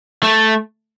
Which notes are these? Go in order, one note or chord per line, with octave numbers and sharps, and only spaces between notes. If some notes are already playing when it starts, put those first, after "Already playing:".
A3